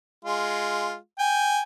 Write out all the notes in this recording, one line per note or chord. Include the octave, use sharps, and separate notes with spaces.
G#3 F4
G5 G#5